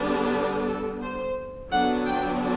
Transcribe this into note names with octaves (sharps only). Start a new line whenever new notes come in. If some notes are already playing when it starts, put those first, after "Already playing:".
Already playing: D3 G3 B3 D4
A4
A4
C5
D3 F#3 B3 D4 F#5
G5